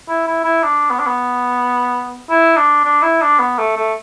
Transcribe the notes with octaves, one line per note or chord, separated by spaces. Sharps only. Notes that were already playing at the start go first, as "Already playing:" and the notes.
E4
E4
E4
D4
B3
D4
B3
E4
D4
D4
E4
D4
B3
A3
A3